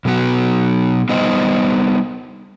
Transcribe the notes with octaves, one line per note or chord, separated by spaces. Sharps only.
B2 F#3 B3 F#4
G3 B3 D#4 C5 D#5